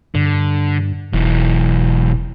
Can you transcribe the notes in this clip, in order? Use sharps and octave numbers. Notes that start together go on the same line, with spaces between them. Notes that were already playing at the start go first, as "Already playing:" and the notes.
G2 D3
E1 B1 E3